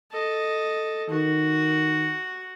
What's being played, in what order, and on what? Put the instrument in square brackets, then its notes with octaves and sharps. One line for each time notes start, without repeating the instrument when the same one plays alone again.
[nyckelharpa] A4 D#5
[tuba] D#3 [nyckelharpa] F#4